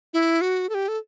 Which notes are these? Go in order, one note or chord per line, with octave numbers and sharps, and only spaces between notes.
E4
F#4
A4
G4
A4